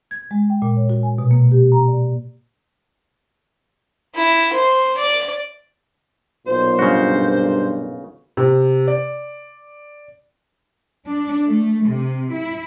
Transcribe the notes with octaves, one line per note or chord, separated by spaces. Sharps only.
G#6
G#3
G5
A#2
C#5
F#4
G#5
B2
A#3
G4
A#5
D5
E4
C5
D5
B1 A#2 C5
G2 C#3 F#4
C3
D5
D4
A3
C3
E4